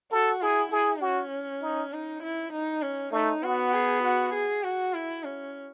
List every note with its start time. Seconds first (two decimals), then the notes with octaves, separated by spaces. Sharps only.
0.12 F#4 A4
0.41 E4 G#4
0.72 E4 G#4
1.01 C#4 F#4
1.62 D#4
1.92 D#4
2.22 E4
2.53 D#4
2.82 C#4
3.12 A3 D#4
3.43 B3 F#4
3.73 G#4
4.03 F#4
4.33 G#4
4.63 F#4
4.94 E4
5.24 C#4